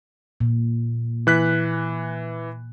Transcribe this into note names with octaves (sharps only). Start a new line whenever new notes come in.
A#2
E3 F#6 B6